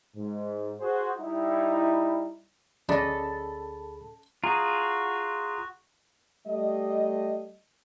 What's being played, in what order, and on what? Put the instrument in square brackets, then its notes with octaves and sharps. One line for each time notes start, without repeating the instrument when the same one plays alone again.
[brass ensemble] G#2
F#4 G#4 C5
G3 D#4 E4
[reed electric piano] D2 G#4 B5 [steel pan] C#4 D5 D#5 [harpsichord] D4 [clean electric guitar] A4
[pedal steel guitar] F4 G#4 [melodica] F#4 [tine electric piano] A#5
[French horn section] G3 A3 D#5